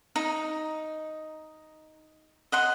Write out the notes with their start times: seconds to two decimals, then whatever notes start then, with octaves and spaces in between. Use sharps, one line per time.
0.16 D#4
2.52 D#5 F#5 C6